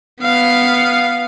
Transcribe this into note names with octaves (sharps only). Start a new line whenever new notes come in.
B3 F5